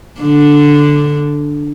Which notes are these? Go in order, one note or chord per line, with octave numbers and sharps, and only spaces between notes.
D3 D4